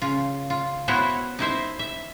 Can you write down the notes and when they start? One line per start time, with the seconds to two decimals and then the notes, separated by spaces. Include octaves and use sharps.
0.02 C#3 F4
0.50 F4
0.88 B3 E4 F#4 C5 C#5
1.39 D#4 E4 C5 E5
1.79 E5